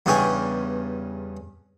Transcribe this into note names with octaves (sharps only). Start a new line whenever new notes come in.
E2 G2 C#3 G4 G#4 C#6